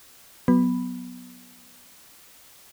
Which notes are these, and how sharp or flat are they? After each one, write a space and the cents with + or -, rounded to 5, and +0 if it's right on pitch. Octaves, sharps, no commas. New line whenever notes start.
F#3 -10 B3 +0 B5 +0